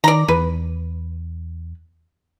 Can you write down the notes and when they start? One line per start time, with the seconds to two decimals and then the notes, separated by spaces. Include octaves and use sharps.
0.04 D#3 D5 A#5
0.28 E2 B4